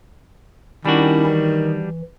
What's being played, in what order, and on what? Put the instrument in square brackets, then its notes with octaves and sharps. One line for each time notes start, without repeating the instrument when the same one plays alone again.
[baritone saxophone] D#3 [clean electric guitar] G3 D4 F#4 [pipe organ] C#4 E4
[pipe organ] E3